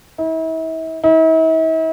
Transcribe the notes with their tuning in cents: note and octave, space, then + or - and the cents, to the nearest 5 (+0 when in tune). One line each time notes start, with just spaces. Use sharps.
E4 -40
E4 -45